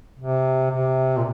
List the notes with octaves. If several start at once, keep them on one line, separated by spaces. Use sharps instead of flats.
C3
C3
A#2